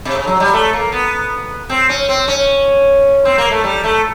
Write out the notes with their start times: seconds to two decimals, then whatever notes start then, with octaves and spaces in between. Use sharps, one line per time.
0.05 C3
0.15 C#3
0.27 F#3
0.40 G3
0.53 A3
0.73 A#3
0.92 B3
1.69 C4
1.89 C#4
2.09 C4
2.28 C#4
3.25 C4
3.38 A#3
3.51 A3
3.64 G3
3.84 A3